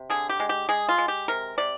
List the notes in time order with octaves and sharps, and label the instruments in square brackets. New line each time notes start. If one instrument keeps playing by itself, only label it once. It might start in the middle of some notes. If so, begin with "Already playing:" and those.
Already playing: [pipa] C3
D3 G#4
G4
G#3
G4
G#3 G#4
F4
G#3
G4
C3 A#4
C3 D5